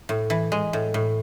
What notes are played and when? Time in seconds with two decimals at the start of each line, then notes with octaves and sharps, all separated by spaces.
0.09 A2
0.30 E3
0.52 G#3
0.73 A2
0.94 A2